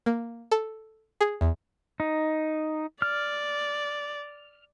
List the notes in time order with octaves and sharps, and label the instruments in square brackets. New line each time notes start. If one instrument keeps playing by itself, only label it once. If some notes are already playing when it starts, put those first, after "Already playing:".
[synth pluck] A#3
A4
G#4
E2
[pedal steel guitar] D#4
[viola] D5 [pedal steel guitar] F6